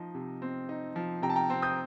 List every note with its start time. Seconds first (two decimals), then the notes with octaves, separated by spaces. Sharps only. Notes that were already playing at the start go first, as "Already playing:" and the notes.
Already playing: F3 D#4 D#5
0.15 C3
0.42 C4
0.69 D#4
0.96 F3
1.22 C3 G5 A#5
1.30 A5
1.36 G5 A#5
1.50 C4
1.62 D#6 G6